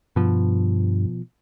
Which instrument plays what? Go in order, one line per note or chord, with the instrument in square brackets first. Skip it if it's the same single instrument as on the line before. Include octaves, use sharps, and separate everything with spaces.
[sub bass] G2 [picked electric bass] B2 F3